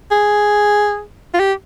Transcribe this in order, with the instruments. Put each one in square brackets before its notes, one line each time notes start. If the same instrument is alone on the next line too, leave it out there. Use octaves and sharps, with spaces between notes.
[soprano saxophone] G#4
F4
G4